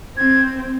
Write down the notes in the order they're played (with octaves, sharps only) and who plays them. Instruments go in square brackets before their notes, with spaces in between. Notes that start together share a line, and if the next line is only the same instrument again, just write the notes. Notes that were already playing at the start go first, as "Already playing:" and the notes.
[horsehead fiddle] C4 [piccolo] G#6